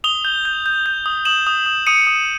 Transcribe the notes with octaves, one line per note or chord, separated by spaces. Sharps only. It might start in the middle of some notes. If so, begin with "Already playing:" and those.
D#6 F7 G7
G6
G6
G6
G6
D#6
D#6 E7 F#7
D#6
D#6
D#6 C#7 D#7
D#6